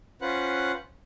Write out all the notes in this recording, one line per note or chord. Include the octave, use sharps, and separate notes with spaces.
C#4 F4 B4 C5 F#5 F#6